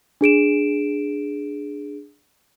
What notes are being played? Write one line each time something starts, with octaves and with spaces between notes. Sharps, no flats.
D4 G#4 D7 E7